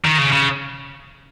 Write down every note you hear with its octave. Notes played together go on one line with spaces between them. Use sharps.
D#3
C#3
C#3